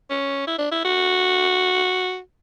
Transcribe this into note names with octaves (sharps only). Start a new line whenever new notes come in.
C#4
E4
D4
E4
F#4